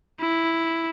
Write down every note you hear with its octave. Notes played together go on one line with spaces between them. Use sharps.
E4